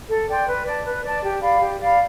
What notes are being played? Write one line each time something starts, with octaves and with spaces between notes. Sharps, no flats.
A4
D5 G5 C6
B4
D5 A5
B4
D5 A5
G4
D5 F5 B5
G4
D5 F5 B5